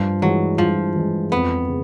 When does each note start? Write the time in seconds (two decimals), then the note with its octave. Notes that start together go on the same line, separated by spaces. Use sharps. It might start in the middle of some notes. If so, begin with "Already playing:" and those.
Already playing: G2 F3
0.22 E3 F#3 G#3
0.58 G2 F3
0.96 E3 G#3
1.32 F2 B3
1.68 C#3